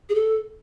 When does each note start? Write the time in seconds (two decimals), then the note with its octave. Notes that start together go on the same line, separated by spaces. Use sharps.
0.09 G#4
0.15 A4